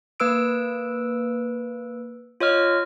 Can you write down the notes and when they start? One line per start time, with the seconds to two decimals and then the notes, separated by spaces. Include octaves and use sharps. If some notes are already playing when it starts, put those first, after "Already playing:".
0.20 A#3 B4 E6 D7
2.40 F4 C#5 D#5 F6